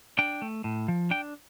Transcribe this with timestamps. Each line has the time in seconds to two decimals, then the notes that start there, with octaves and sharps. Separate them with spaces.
0.19 D4 G5
0.42 A3
0.64 A2
0.88 F3
1.11 D4 G5